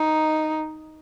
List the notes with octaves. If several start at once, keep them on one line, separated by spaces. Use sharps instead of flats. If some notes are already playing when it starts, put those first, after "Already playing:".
Already playing: D#4